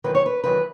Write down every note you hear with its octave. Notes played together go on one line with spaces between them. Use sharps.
E2 D#3 F#3 B4
C#5
B4
E2 D#3 F#3 B4